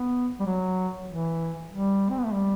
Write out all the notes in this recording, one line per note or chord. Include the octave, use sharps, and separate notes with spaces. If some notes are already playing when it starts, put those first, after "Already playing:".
Already playing: B3
G3
F#3
E3
G3
C4
B3
A3
G3